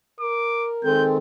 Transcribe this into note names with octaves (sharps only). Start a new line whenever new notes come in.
A#4 D6
D#3 G#3 C4 A4 G6